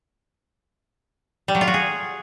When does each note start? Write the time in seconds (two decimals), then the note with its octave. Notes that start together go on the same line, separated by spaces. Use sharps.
1.48 G3
1.55 F#3
1.61 F4
1.67 F#4
1.74 G#4